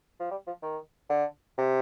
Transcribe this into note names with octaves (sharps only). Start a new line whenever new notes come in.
F3
G3
F3
D#3
D3
C3